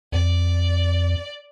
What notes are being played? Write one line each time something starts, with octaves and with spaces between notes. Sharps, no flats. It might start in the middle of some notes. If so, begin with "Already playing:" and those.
F2 D5